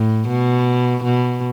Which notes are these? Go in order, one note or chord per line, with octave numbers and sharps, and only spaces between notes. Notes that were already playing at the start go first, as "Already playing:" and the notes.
Already playing: A2
B2
B2